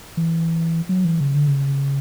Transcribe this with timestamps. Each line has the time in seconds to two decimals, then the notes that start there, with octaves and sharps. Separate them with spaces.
0.17 E3
0.89 F#3
1.05 E3
1.20 C#3
1.34 D3
1.48 C#3